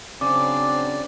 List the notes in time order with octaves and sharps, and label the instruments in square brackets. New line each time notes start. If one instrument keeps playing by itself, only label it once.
[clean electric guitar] C#3 [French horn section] F#3 C4 D4 [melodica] D5 [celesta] D6